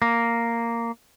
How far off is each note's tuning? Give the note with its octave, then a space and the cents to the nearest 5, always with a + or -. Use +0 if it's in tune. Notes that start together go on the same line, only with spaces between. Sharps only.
A#3 -5